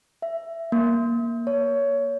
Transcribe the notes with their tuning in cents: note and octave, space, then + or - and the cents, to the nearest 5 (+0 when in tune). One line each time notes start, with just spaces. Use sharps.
E5 +15
A#3 +10
C#5 +20